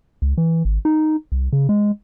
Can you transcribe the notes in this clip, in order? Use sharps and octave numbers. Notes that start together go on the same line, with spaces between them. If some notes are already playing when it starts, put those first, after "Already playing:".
C#2
E3
G#1
D#4
C2
C#3
G#3